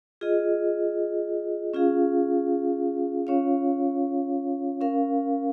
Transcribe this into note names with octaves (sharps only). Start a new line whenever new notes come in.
F4 G#4 D#5
C#4 F4 G#4 F5
C#4 F4 C#5 F5
C#4 A#4 F5